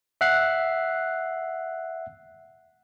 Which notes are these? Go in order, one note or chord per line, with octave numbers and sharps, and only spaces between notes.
E5 F#5 F#6 C7